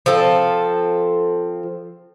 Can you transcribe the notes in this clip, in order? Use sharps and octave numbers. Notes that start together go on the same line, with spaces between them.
F3 C4 A4